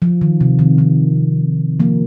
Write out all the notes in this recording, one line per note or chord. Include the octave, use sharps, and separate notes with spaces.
F3
D#3
C3
D#3
D#3
F3 A#3